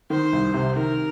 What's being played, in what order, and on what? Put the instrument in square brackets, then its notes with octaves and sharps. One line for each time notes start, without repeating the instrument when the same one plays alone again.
[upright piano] D#3 [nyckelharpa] C5
[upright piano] C2
C3
[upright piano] D#3 [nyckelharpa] A#4